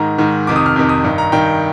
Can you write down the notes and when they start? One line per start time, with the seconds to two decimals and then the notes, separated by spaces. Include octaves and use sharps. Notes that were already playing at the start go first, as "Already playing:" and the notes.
Already playing: G#2 D#3 A#5
0.18 G#2 D#3
0.47 F2 C3 D#3 D6
0.56 D#6
0.66 F6
0.76 F2 C3 D#3
0.89 D#6
1.04 G2 D#3
1.18 A#5
1.32 G2 D#3 G5